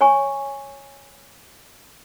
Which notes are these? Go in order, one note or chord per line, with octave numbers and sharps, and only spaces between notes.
C#5 G#5 A#5 C#6